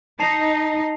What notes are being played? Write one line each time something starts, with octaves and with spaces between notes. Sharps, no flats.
D#4 A5 C7 F7